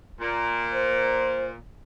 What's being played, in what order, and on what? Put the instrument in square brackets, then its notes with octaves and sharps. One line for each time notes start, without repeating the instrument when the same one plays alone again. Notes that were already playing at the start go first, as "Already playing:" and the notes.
[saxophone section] A#2
[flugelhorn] C5